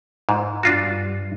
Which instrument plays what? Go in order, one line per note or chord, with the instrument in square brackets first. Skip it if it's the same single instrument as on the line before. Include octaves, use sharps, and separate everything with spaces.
[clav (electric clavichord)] G#2
[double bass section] G2 [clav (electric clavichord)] D4 F4 F#4